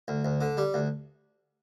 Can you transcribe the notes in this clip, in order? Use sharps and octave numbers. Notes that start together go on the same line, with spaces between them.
D2
D2
D3
G3
D2